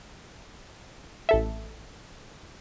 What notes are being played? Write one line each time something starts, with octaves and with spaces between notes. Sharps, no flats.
A1 A4 E5